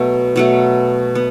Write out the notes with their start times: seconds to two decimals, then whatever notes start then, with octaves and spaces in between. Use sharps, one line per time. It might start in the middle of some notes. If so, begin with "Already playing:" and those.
Already playing: B2 F#3 A3
0.36 B2 F#3 A3
1.15 B3